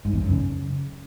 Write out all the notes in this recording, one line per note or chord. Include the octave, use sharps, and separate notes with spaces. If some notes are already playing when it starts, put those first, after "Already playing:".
G#2
E2
F#2
C#3